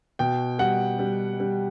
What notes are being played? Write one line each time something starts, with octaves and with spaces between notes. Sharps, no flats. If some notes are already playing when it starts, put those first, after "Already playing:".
B2 G5
G3 F#5
G3
G3